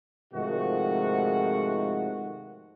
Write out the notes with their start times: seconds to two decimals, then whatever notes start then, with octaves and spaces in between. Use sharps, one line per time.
0.34 G#2 C3 D#3 F3 A3 F#4